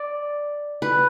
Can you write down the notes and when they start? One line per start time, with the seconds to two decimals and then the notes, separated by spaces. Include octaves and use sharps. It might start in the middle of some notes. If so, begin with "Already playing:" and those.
Already playing: D5
0.82 B4